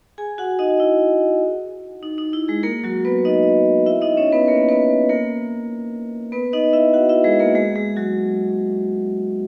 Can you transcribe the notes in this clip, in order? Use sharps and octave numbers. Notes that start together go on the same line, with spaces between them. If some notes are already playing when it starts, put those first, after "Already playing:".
G#4 G#5
F#4 F#5
D#4 D#5
E4
D#4
D#4
E4
G#3 G#4
A#3 A#4
F#3 F#4
B3 B4
D#4 D#5
E4 E5
D#4 D#5
C#4 C#5
B3 B4
A#3 A#4
B3 B4
A#3 A#4
B3 B4
D#4 D#5
E4 E5
F#4 F#5
E4 E5
G#3 G#4
A#3 A#4
G#3 G#4
G#3 G#4
F#3 F#4